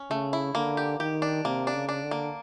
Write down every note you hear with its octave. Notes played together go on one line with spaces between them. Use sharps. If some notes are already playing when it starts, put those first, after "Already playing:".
Already playing: C#4
C#3 A3
E4
D3 A#3
G4
D#3 G4
D4
C3 A#3
D4
C#3
D4
D3
A#3